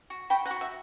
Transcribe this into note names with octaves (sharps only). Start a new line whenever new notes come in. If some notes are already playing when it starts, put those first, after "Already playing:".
F#4
F#4 G5 B5
F#5 A#5
F#4
E5